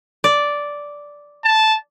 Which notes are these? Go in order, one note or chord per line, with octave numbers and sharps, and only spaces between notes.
D5
A5